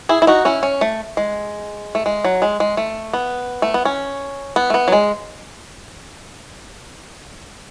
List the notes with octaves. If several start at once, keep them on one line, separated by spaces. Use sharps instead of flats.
E4 G#4
E4
D#4 F#4
C#4 E4
C#4
A3
G#3
A3
G#3
F#3
G#3
G#3
A3
B3
A3
B3
C#4
B3
A3
B3
F#3
G#3